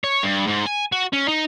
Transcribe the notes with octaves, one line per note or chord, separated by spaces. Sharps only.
C#5
G2
G#2
G#5
F#4
C#4
D#4